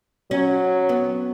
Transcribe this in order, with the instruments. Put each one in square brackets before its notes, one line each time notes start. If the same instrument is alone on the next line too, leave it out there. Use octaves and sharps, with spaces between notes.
[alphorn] F#3 [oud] C#4
[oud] B3